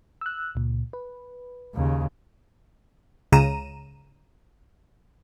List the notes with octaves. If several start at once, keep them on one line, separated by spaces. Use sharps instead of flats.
E6 F#6
C#2 A#2
B4
D#2 C#3
C#2 C#3 A#5 D#7 E7